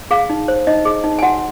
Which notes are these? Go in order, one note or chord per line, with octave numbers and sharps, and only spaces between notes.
G#4 F5
D#4
C5
D#4 D#5
G#4
D#4
G#5
F#4 F#5